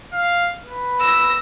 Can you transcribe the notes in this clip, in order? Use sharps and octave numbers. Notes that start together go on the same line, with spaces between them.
F5
B4
E6 A#6